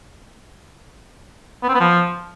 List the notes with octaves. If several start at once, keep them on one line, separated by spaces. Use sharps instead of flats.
B3
C4
B3
F3